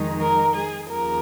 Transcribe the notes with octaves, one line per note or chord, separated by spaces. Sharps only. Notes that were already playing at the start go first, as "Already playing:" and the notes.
Already playing: F2 D#3 G#3 D#4
A#4
G#4
D#2 C#3 F3 A#4